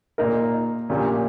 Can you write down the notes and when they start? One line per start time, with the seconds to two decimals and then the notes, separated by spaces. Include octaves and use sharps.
0.18 A#2 A#3 D#4 A#4
0.89 A#1 A#2 A#3 C#4 G4